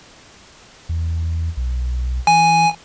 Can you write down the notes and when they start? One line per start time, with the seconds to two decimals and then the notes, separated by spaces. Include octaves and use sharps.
0.89 E2
1.57 B1
2.27 E3 G#5